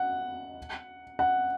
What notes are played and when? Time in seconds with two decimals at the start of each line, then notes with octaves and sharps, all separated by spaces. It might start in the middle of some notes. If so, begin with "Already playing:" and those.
Already playing: F#5
1.19 F#5